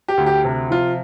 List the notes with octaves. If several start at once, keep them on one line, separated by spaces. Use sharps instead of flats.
G4
D2
G4
C3
F3 F4